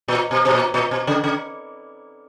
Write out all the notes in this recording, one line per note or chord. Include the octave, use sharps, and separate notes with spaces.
A#2
B2
B2
A#2
A#2
B2
C#3
C#3